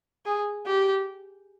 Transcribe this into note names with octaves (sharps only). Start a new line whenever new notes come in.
G#4
G4